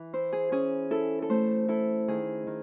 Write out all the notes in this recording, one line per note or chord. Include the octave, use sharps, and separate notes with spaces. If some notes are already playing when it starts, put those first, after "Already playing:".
Already playing: E3
E4 C5
G#4
C#4 G#4
E4 A4
A4
A3 C5
E4 A4
D#3 G#4
D#3